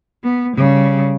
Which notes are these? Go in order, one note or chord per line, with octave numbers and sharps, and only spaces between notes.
B3
C#3 G3